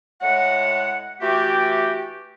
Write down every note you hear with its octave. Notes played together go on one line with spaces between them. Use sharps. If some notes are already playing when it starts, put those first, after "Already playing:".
A2 G#3 C#5 F#5
E3 A3 F#4 G4